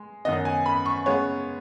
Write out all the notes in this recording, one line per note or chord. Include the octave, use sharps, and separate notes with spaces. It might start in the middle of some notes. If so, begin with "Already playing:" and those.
Already playing: G#3
F#2 D#3 B3 D#5
G#5
B5
C#6
C#3 G#3 B3 C#5